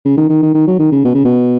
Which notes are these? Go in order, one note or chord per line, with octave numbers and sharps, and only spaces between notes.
C#3
D#3
D#3
D#3
D#3
F#3
D#3
C#3
B2
C#3
B2